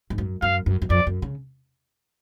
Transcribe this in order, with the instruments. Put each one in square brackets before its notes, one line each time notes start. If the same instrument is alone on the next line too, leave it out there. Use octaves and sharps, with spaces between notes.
[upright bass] G#2
F#2
[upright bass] F#2 [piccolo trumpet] F5
[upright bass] F#2
F#2
[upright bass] F2 [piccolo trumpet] D5
[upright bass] F#2
C#3